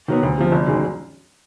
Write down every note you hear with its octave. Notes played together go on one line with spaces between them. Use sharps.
D#3 F#3 B3
D2
C3 F3
G1
F#2 D#3 G#3